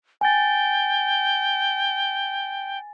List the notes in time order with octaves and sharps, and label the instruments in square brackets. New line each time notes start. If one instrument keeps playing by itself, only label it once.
[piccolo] G5 [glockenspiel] G#5 A6